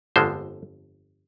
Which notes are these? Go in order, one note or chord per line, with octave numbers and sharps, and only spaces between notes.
G1 F2 D3 F3 G#3 C5